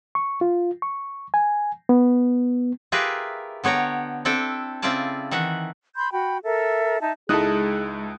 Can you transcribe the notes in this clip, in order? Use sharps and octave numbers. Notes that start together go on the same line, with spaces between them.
C#6
F4
C#6
G#5
B3
F4 G4 G#4 A#4 B4 E5
D3 B3 C#5 G5 A#5
C4 D4 E4 A4 G5
C#3 C4 E4 F4 D5 A5
D#3 E3 E5 F#5
B5 C6 G6
F#4 G5 B5
A4 A#4 E5
D#4 E5 A5
C#2 G#3 D#4 E4 G#4 A4 D#6 F#6